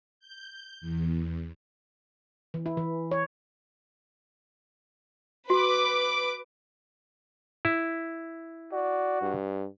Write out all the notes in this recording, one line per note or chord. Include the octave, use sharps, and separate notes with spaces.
G6
E2
E3
E4
E3
C#5
F#4 B4 D6
E4
F#4 D5
G2